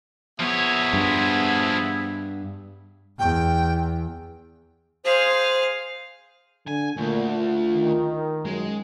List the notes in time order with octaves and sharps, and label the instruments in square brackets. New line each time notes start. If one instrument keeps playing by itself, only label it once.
[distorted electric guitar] F3 C#5 [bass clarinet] B3 [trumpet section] G#4 E5
[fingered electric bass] G2
[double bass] E2 [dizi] G5
[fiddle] G#4 F5 [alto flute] C5
[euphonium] D3 [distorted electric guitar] G#5
[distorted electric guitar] D2 [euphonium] A#2 [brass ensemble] D3
[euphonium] F4
[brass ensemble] D#3
[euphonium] F#2 [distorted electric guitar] G#3